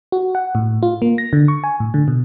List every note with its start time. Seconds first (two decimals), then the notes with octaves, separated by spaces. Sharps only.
0.12 F#4
0.35 F#5
0.55 A2
0.83 F4
1.02 A#3
1.18 A#6
1.33 D3
1.48 C#6
1.64 G#5
1.80 A2
1.94 D3
2.08 B2